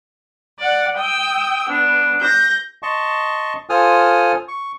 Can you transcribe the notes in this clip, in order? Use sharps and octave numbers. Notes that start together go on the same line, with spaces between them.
D5 F#5
G5 D#6 E6
B3 D4
G6 A#6
D#5 A5 C6 C#6
F4 A4 C5 G#5 D#6 F6
C#6